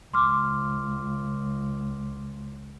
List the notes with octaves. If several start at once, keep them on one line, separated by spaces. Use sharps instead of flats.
C#2 C6 D6 F6